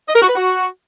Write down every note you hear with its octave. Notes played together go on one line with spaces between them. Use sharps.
D#5
A#4
F#4
B4
F#4